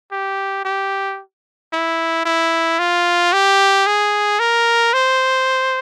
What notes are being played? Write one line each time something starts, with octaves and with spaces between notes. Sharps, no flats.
G4
G4
E4
E4
F4
G4
G#4
A#4
C5